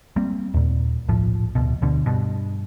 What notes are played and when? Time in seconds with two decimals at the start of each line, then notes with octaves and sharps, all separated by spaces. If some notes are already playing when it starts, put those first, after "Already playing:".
0.16 G3 A#3 C4
0.54 D#2 A#2
1.08 D#1 B1 A2 F3
1.55 D1 D2 B2
1.82 D2 B2 D3
2.06 G2 B2